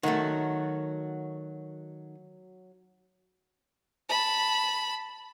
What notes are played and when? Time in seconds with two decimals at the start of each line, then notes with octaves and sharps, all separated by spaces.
0.03 D#3 F#3 A3 F#4
4.09 A5 B5